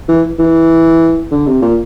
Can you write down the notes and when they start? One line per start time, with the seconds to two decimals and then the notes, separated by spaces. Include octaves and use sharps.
0.08 E3
0.39 E3
1.31 D3
1.47 C3
1.62 A#2